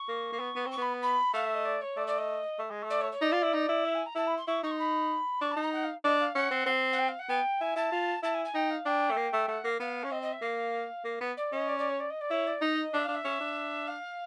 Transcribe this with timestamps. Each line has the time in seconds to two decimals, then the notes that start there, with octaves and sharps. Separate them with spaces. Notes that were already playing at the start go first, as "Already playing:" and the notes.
Already playing: C#6
0.08 A#3
0.32 A#3
0.39 B3
0.56 B3
0.66 C4 C#6
0.78 B3 B5
1.02 B5
1.34 A3 F5
1.44 E5
1.54 D#5
1.65 D5
1.81 C#5
1.96 A3 D5
2.07 D5
2.18 D#5
2.59 A3
2.71 G#3
2.83 A3
2.90 D5
3.00 C#5
3.11 C#5
3.21 D#4 D5
3.32 F4
3.43 E4
3.53 D#4
3.69 E4
3.84 E5
3.94 G#5
4.05 A#5
4.15 E4 A5
4.27 B5
4.36 C6
4.47 E4 C#6
4.63 D#4 C#6
4.70 C6
4.78 B5
5.41 D4 C#6
5.51 A5
5.56 D#4
5.62 A#5
5.72 F#5
5.83 F5
6.04 D4 D#5
6.19 F5
6.35 C#4 F#5
6.51 C4
6.66 C4
6.92 F#5
6.98 G5
7.08 F5
7.19 F#5
7.29 B3 G5
7.60 E4 G#5
7.76 E4 A5
7.92 F4
8.23 E4 A5
8.34 G#5
8.44 G#5
8.54 D#4 G5
8.70 F5
8.85 D4 G5
9.11 A3
9.17 A#3
9.33 A3
9.48 A3 F#5
9.64 A#3
9.80 B3 F5
10.04 C#4
10.11 C4 D#5
10.22 D#5
10.32 E5
10.42 A#3 F5
11.05 A#3
11.21 B3
11.37 D5
11.52 C#4 D#5
11.68 D5
11.78 D5
11.88 C#5
11.99 D5
12.10 D#5
12.20 D5
12.30 E4 C#5
12.47 D5
12.61 D#4 D#5
12.93 D4 E5
13.03 D4 F5
13.14 E5
13.25 C#4
13.40 D4
13.87 F5